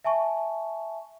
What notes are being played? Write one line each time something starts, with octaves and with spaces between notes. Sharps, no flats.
E5 G#5 A5 C#6